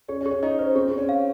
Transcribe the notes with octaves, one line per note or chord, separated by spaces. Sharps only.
C#4 G#4
C#4
G#4
C#4
D#4 D#5
C#4 C5
C4 G#4
C4 G#4
C#4
F5